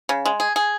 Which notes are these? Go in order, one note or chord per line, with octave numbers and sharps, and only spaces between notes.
C#3
G#3
G#4
G#4